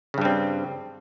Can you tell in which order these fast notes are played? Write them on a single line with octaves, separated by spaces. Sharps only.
C#3 G2 G3 C4